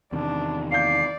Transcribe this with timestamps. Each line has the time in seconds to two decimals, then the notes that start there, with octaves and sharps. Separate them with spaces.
0.12 E2 C3 D#3 D4
0.72 D5 F5 G6 C7